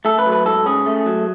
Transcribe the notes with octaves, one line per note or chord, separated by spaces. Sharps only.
A3 A4
B4
F#3
B4
G#2 A4
C#4 G#4
A3
F#3